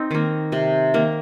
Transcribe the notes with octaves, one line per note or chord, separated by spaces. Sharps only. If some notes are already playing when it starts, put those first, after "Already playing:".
Already playing: C4 D#4
D#3 A#3
C3
D#3 A#3